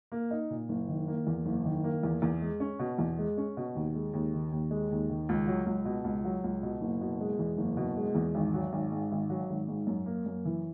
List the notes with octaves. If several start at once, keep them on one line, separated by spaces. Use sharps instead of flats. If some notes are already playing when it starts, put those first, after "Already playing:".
A#3
D#4
A#2
F#1
D#3
A#3
E2
F#1
D#3
A#3
E2
E2
G#3
C#4
B2
E2
G#3
C#4
B2
D#2
G#3
D#2
D#3
D#2
G#3
D#2
D#3
C#2
F#3
C#2
B2
C#2
F#3
C#2
B2
F#1
B2
G#3
E2
F#1
B2
G#3
E2
G#1
F#3
G#1
G#2
G#1
F#3
G#1
G#2
F#2
A#3
F#2
E3